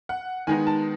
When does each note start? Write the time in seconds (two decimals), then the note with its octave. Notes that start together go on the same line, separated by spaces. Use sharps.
0.09 F#5
0.47 D#3 G#3 B3 D#4 G#5
0.67 A5